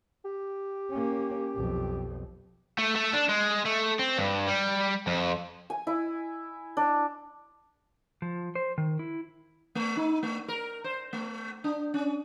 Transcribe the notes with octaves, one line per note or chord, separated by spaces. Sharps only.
G4
A#3 C#4
B1 F2
A3
A3
D4
G#3
A3
C4
G2
G3
F2
G#5
E4
D4
F3
C5
D#3
E4
A3
D#4
A3
A#4
C5
A3
D4
C#4